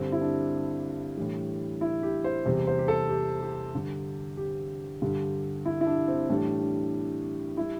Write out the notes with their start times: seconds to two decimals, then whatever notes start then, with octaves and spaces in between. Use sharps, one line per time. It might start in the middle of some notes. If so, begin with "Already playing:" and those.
Already playing: G2 D3 G3 C4
0.12 E4
0.22 D4
1.17 A2 E3 G3
1.81 E4
2.03 G4
2.24 C5
2.46 E2 C3 G3
2.67 C5
2.79 G4
2.88 A4
3.09 G4
3.41 G4
3.73 G2 D3 G3
4.37 G4
5.02 G2 D3 G3
5.66 E4
5.81 E4
5.87 D4
6.08 C4
6.29 A2 E3 G3 D4
6.61 D4
7.57 G3 E4